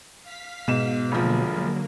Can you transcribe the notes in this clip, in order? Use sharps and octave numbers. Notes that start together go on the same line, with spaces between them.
F5 B6
G#2 B2 E7
E1 D3 F3 F#3 A#3